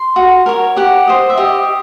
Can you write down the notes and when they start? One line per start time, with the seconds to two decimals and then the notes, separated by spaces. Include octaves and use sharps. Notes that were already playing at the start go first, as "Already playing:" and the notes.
Already playing: C6
0.16 F#4
0.46 A#4 C#5
0.77 G4 F#5
1.07 C5 D#5
1.29 E5
1.37 G4 D#5